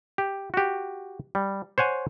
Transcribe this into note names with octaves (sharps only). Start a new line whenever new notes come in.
G4
F#4 G4
G3
C5 C#5 F#5 G#5